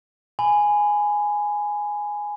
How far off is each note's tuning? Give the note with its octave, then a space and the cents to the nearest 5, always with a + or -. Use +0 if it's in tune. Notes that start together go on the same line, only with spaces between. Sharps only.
G#5 +0 B5 +20